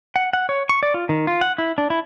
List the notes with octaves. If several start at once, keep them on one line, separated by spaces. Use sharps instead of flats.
F#5
F#5
C#5
C#6
D5
F4
D#3
F4
F#5
E4
D4
E4